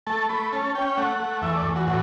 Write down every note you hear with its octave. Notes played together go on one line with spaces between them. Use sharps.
A3 A5
A3 B5
C#4 A5
C#4 G5
A3 F#5
A3
E2 E5
D5
E2
F#4
A2 F#4